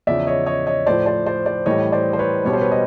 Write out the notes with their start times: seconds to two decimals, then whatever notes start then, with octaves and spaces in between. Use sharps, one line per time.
0.07 E2 C#3 F3 D5 E5
0.27 C#5 D#5
0.46 C#5 D#5
0.67 C#5 D#5
0.86 A2 F3 C5 D5
1.06 C5 D5
1.26 C5 D5
1.46 C5 D5
1.66 A2 E3 G3 C#5 D#5
1.92 C5 D5
2.13 C5
2.19 B4 C#5
2.45 B2 G3 C#5
2.53 C5
2.61 B4 C#5
2.71 D#5